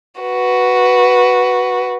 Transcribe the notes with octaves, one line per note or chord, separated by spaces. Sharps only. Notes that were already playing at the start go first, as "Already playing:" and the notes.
F#4 B4